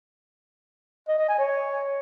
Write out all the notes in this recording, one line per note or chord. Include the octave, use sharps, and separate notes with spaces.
D#5
D#5
G#5
C#5